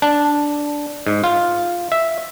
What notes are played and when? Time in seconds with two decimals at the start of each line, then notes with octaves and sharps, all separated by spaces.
0.02 D4
1.07 G#2
1.24 F4
1.92 E5